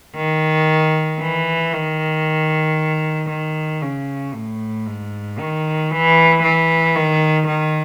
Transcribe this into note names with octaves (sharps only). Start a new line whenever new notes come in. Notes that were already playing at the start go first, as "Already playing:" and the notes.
D#3
E3
D#3
D#3
C#3
A2
G#2
D#3
E3
E3
D#3
D#3